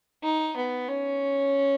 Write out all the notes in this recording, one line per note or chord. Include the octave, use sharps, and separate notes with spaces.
D#4
B3
C#4